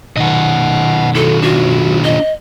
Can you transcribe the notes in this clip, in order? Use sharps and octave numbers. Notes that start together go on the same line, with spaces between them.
B1 D#3 D#5 F#5
E4 F#4 A4
D4 F4 F#4
D#5